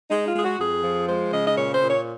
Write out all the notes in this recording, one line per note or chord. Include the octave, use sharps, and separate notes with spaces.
G#3 D#4
F4
G#3 G#4
F#4
F2 G#4
F3
G#3 C5
C#3 D#5
D#5
A#2 C#5
C5
A#2
C#5